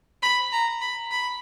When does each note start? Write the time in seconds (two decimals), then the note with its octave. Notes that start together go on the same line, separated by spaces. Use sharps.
0.22 B5
0.52 A#5
0.81 B5
1.11 B5